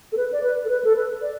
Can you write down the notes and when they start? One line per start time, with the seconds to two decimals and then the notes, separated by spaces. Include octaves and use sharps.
0.12 A4
0.17 B4
0.32 D5
0.43 B4
0.65 A4
0.70 B4
0.84 A4
0.96 B4
1.22 D5